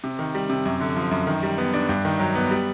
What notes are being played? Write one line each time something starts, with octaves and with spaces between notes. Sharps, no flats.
C3
D#3
G3
C3
F#2
D3
F3
F#2
D#3
G3
B3
D4
G2
D#3
F#3
B3
G3